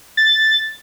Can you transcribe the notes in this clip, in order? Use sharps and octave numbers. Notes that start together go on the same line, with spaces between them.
A6